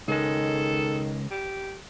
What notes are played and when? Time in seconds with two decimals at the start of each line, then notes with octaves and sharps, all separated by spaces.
0.08 C#2 D#3 G#3 A4
1.31 G4